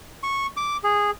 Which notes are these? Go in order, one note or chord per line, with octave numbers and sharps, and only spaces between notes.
C#6
D6
G#4